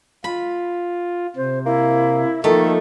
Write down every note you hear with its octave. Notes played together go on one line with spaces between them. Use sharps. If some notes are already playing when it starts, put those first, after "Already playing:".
F4 B5
C3 C5
A#3 E4
D#3 F3 A3 A#3 D#4 A4